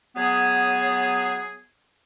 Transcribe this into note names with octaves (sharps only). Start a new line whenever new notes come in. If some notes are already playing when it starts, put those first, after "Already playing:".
F#3 B3 G#4